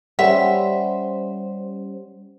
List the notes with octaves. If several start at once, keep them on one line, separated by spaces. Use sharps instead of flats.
G3 C#4 C5 E5 F#5